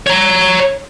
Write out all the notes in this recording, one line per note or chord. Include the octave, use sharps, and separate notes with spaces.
C#5 A#5